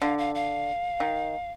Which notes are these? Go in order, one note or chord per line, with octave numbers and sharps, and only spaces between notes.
D3 F5
F5
F5
D#3